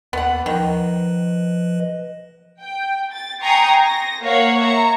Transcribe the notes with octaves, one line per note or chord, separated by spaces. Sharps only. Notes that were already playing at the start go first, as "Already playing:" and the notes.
D#2 B3 F#5
D#3 F3 B4 D#5
G5
A6
G5 G#5 A#5 C6 C#6 D#6
A#6
A#3 C#5 F5 F#5
E5 A#5 C#6